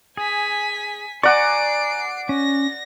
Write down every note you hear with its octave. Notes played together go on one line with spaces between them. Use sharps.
G#4 G#5 B6
D5 F#5 G#5 A#5 C#6 C7 D7
C#4 A#6